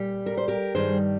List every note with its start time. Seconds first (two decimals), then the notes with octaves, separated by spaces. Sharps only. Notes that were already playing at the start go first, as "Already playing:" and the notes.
Already playing: A#2 G3
0.26 A#4
0.37 C5
0.48 G4 A#4
0.75 G2 D#3 G3 G#4 C5